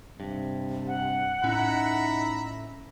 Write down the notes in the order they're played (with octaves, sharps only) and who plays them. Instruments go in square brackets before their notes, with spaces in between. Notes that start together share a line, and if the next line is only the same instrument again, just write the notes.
[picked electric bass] G2 [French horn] C3
[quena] F#5
[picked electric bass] A2 C#4 [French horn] D#4 [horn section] E5 A#5 B5